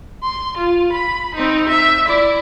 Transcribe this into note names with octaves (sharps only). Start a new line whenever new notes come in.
C6
F4
B5
C4 D#4
E5
E4 D5